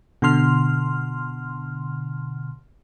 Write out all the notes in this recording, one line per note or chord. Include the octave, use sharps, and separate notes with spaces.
B2 D3 C6 F6